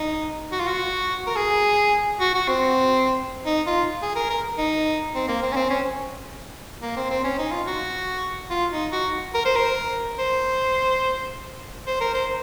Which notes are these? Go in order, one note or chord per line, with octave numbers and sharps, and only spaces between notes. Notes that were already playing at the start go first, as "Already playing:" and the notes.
Already playing: D#4
F#4
F4
F#4
A#4
G#4
F#4
F#4
C4
D#4
F4
G#4
A#4
A#4
D#4
C4
A#3
C4
C#4
C4
C#4
A#3
C4
C4
C#4
D#4
F4
F#4
F4
D#4
F#4
A#4
C5
A#4
C5
C5
A#4
C5